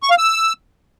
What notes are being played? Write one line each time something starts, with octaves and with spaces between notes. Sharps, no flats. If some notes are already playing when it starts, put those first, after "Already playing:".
C#6
F5
E6